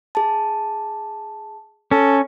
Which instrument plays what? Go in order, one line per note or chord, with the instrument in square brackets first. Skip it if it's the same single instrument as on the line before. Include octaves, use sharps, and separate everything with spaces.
[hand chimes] G#4 A5
[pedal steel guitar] C#4 [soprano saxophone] A4